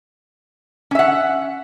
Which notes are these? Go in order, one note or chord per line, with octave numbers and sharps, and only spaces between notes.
C#4 E5 F#5